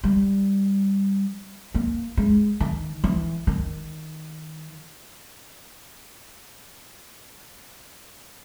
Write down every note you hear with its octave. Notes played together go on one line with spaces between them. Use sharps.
G3
A#3
G#3
D#3
E3
D#3